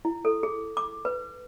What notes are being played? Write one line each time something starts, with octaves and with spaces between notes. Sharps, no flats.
E4
A4
G#4
D6
B4